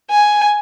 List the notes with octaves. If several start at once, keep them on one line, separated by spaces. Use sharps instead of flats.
G#5